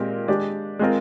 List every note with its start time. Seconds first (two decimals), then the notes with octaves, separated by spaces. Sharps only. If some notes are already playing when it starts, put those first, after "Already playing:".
Already playing: A#2 G#3 C4 G4 A#4
0.28 G#3 D4 G4 D5
0.79 G#3 C4 F4 A#4